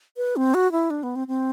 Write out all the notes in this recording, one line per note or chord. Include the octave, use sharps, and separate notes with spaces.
B4
C4
F#4
E4
D4
B3
C4
C4